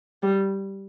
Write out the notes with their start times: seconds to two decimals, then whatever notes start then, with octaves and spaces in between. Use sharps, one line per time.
0.23 G3